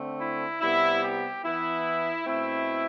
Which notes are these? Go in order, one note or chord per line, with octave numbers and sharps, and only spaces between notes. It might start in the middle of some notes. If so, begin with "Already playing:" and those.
Already playing: D3 A3 C4
E4
C3 G3 B3 E4
G4
E3 B3 E4
B2 A3 C4 E4